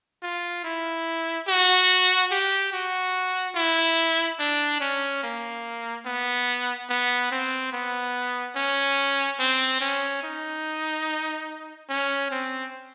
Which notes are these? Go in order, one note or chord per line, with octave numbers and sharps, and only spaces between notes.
F4
E4
F#4
G4
F#4
E4
D4
C#4
A#3
B3
B3
C4
B3
C#4
C4
C#4
D#4
C#4
C4